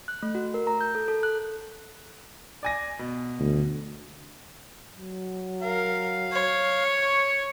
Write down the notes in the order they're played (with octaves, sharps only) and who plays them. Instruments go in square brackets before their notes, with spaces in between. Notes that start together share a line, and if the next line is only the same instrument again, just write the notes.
[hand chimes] F#6
A3
F#4
A#4
A#5
G6
A4
A4
F#6
[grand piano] D5 G#5 A#6
B2
[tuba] D2
[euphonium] F#3
[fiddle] A#4 [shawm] F5
[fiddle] C#5
[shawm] C#6